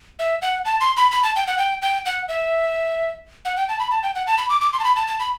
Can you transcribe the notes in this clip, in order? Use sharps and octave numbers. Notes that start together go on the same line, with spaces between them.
E5
F#5
A5
C6
B5
B5
A5
G5
F#5
G5
G5
F#5
E5
F#5
G5
A5
B5
A5
G5
F#5
A5
B5
D6
D6
C6
A5
B5
A5
A5
B5